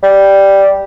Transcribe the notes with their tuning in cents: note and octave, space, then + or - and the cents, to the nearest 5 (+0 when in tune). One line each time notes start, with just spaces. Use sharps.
G3 +0